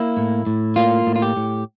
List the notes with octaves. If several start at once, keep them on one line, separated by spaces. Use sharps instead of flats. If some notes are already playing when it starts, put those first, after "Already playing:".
Already playing: A#3 E4
A2
A2
A#3 F4
A2
F4
G4
A2